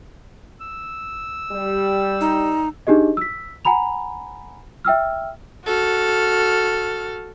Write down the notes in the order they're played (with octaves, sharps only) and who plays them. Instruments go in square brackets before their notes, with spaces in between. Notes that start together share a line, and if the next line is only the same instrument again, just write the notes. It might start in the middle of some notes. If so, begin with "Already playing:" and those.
[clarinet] E6
[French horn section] G3
[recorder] D#4
[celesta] D4 D#4 G4 G#4 D#5
E6 B6
F#5 G#5 A#5 B5 F7
E5 G5 E6 F6
[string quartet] F#4 A4 F6